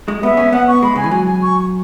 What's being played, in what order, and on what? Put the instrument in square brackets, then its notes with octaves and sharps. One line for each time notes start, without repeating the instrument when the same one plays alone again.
[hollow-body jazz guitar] G#3
[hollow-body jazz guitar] B3 [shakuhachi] E5
[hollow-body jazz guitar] C#4
[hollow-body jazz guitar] B3 [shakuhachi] F#5
[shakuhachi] C#6
[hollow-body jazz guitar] G#3 [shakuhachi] B5
[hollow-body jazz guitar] C#3 [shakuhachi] G#5
[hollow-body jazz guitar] E3
[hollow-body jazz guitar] F#3 [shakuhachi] G#5
[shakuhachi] G#5
C#6